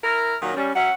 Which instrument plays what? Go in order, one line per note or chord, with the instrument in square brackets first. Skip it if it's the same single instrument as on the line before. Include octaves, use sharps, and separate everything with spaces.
[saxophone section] E4 A#4
A#2 D#3 F#3
[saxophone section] G3 [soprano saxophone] C#4
[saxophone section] F#3 C#4 E5 [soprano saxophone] F#5